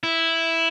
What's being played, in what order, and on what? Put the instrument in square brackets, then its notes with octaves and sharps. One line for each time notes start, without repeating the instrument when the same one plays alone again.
[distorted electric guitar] E4